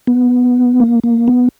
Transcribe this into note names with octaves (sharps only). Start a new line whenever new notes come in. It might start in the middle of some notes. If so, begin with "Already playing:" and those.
B3
A#3
A#3
B3